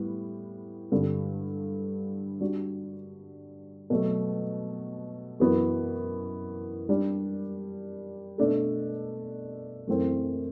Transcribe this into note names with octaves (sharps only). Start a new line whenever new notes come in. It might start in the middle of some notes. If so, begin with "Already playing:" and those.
Already playing: A2 G3 B3
G2 D3 G3 D4
G3 D4 F#4
B2 F#3 A3
F#2 E3 B3 F#4
G3 D4 G4
B2 A3 D4 A4
F#2 E3 A3 C4